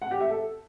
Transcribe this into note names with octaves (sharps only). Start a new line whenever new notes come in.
F#5
G4
E5
A4